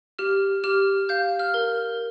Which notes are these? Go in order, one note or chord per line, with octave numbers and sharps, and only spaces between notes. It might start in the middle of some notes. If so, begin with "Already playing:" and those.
G4 F6
G4 F6
F5 G6
F6
A#4